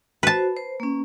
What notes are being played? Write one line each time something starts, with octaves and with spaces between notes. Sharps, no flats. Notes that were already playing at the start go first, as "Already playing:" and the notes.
F#4 B4 C5 A5
C5
A#3 C#4